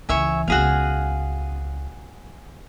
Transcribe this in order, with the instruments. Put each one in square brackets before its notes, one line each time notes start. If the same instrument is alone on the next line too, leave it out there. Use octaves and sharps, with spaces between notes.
[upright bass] C#2 E3 [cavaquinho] C#5 E5 G#5
[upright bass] C#2 B3 [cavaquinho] F#4 G#4 F5